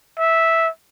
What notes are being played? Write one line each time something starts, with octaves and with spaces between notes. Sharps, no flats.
E5